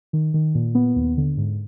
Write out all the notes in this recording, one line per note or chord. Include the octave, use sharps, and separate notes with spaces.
D#3
D#3
A#2
B3
D#2
D3
G#2